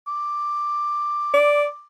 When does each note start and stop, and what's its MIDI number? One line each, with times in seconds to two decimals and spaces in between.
0.07 1.86 86
1.34 1.66 74